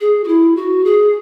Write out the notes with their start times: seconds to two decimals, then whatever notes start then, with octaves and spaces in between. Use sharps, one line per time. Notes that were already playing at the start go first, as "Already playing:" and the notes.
0.01 G#4
0.24 F#4
0.28 E4
0.56 F#4
0.85 G#4